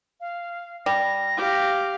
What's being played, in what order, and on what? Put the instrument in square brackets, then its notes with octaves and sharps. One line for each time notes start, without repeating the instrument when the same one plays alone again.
[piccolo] F5
[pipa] G3 [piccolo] A#6
[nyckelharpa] G4 F5